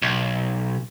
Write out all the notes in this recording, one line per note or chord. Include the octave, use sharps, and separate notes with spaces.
B1